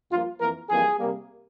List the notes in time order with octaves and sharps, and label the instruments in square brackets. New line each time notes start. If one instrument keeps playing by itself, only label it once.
[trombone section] G2 F3 A#3 F4
F2 E3 A#3 A#4
F2 E3 G3 A#3 G#4
C3 G3 A#3